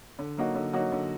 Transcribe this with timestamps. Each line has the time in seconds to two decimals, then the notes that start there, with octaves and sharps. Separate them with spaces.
0.19 D3
0.37 F#3 A#3 D#4 F#4
0.55 D3
0.73 F#3 A#3 D#4 F#4
0.92 D3